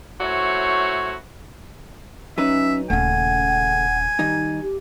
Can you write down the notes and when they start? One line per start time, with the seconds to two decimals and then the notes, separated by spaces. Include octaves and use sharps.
0.20 A3 E4 F#4 C5 C#5
2.38 F#3 C#4 D#4 B4 E5
2.90 D#1 C#3 A3 C#4 F#5 G#5
4.19 D#3 G3 D#4
4.62 G4